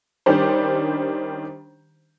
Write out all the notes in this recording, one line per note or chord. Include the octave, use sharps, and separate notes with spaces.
D#3 G3 C#4 D4 G4 C5